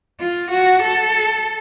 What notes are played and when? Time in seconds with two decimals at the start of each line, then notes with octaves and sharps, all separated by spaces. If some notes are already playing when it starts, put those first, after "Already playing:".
0.20 F4
0.51 F#4
0.83 A4